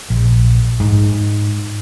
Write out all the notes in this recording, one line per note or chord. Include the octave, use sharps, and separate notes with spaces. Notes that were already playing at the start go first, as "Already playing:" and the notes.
A#1
G#2